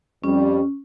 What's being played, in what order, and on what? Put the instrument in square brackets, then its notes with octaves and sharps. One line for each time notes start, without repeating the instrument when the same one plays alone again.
[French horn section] F2 G3 [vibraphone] C#4